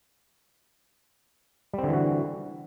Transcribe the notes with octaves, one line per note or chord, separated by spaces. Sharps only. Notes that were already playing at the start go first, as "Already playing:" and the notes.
D3 E3 G3 C4 F#4